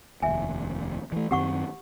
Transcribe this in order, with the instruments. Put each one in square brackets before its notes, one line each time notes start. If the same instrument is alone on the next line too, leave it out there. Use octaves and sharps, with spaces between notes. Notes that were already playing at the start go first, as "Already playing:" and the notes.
[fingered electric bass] F1 D#2 [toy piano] E5 G#5
[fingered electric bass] E3 A3
[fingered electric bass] F#2 D#3 C4 [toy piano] G4 F#5 C#6